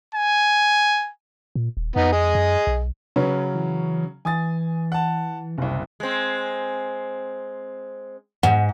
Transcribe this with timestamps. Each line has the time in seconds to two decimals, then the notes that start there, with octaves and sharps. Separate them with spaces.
0.15 G#5
1.55 A#2
1.77 D#1
1.96 F2 B3 D#4
2.12 G#4 D#5
2.35 F#2
2.67 B1
3.16 C#3 F#3 C#4 B4
3.54 E3
4.25 E3 G#5 D#6 A6
4.92 F#5 A5
5.58 F#1 C2 C3
6.00 G#3 C4
8.43 G#2 F#5